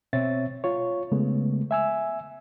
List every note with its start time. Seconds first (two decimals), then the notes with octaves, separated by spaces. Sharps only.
0.13 B2 C4 C#5 E5 A6
0.64 F4 C#5
1.12 C#3 G#3 A3 B3
1.71 E5 G#5 E6